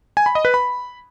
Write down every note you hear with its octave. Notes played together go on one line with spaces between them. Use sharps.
G#5
B5
D#5
B4
B5